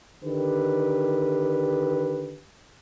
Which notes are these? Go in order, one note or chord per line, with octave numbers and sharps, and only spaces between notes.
D3 D#3 G4 B4